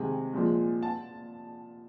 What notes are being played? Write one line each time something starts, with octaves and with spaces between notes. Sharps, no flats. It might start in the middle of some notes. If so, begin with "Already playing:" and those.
Already playing: C3 D#3 G#3 G#5
A#2 F3 G#3
A5